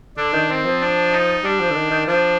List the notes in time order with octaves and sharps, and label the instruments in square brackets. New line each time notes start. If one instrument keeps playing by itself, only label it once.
[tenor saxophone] D3 [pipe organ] D4
[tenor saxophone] D#3
[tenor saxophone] D#3 [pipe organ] C4
[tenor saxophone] F3
[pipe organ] D4
D#4
[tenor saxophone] G3 [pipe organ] D4
[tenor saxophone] F3
D3
D#3
D#3
[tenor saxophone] F3 [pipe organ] D4